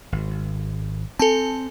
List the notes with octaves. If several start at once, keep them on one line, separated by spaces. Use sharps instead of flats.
G#1
C4 A4 G#5 A5